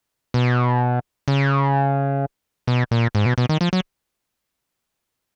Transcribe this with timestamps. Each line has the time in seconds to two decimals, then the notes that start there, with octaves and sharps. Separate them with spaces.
0.34 B2
1.28 C#3
2.67 B2
2.91 A#2
3.15 G#2
3.26 B2
3.38 B2
3.49 D#3
3.61 F3
3.73 F#3